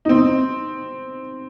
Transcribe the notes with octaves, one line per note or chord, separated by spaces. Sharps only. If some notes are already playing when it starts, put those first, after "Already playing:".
D#4
C4